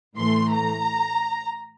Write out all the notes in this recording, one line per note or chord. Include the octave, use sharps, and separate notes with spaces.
A2 E3 A3 C6
A#5